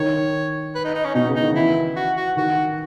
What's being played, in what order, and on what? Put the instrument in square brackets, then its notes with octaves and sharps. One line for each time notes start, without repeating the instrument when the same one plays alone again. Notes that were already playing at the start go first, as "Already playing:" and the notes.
Already playing: [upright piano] D#3 [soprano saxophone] C#5
[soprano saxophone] B4
D#4
D#4
C#4
[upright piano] B2 [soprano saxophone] D#4
[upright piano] C#3
[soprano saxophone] D#4
[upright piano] D#3
[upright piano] E3 [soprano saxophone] E4
[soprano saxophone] F#4
F#4
[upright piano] D#3 [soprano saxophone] F#4